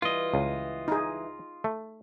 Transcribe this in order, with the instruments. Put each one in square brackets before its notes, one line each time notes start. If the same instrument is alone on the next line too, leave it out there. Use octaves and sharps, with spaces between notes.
[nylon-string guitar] E3 G3 [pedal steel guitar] F4 D#5
[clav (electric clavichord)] C#2
[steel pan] D#4 G#4
[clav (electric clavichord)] A3